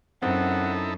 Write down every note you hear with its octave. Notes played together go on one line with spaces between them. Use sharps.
F#2 C4 D#4 E4 A4 F#5